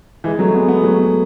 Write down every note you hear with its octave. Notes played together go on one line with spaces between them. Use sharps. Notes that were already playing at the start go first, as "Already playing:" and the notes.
E3 G#3
F#3 A3
G#3 B3
G#3 B3
F#3 A3